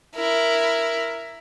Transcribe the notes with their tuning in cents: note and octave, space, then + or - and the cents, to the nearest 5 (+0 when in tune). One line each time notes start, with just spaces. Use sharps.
E4 +10 A#4 +0